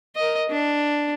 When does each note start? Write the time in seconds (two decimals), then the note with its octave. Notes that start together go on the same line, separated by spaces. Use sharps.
0.16 A#4 D#5
0.49 D4